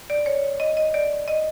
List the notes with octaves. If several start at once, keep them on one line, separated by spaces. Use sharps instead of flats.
D5
C#5
D#5
D#5
D5
D#5